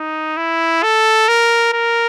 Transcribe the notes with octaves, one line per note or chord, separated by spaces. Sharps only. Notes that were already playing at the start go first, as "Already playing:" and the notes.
Already playing: D#4
E4
A4
A#4
A#4